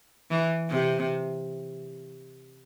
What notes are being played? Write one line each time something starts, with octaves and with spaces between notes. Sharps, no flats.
E3
C3